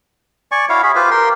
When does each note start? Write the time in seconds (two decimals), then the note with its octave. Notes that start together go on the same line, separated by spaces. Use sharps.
0.52 D5 G#5 C#6
0.69 E4 F#4 C#5 F5
0.83 F#4 G#4 B5
0.95 F4 G4 B4 C5
1.11 G4 A#4 G5 C6